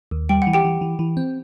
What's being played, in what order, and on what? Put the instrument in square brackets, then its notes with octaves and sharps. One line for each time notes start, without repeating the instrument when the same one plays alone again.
[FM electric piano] D#2
[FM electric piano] G3 [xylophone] G5
[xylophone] F#5
[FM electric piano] E3
[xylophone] G4 G5
[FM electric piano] E3
E3
E3
C4